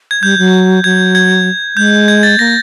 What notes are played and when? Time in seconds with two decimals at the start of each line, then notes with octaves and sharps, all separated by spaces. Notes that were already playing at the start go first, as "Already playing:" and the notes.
0.11 G#6
0.22 G3 G6
0.38 F#3
0.84 F#3 G#6
1.15 G#6
1.76 G#3 G6
2.08 G#6
2.23 A6
2.39 A#3 A#6